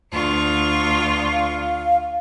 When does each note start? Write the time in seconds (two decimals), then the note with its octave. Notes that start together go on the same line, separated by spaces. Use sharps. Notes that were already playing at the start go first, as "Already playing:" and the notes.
0.11 D2 F4 C#6
1.33 F5